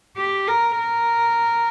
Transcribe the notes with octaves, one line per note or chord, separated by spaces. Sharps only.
G4
A#4
A#4